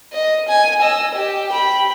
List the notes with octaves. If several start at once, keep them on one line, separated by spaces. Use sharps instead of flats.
D#5
G#5
D#5 E6
G4
G5 B5